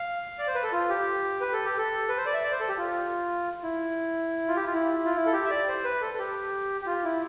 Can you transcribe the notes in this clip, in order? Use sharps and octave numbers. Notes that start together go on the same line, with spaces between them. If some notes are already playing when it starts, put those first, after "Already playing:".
Already playing: F5
D5
C5
B4
A4
F4
G4
B4
A4
G4
A4
B4
C5
D5
E5
D5
C5
A4
G4
F4
E4
F4
G4
F4
E4
F4
E4
A4
G4
E5
D5
C5
B4
A4
A4
G4
G4
F4
E4